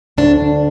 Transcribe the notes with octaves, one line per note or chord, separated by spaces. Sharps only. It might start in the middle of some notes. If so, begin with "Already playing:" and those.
D2 D4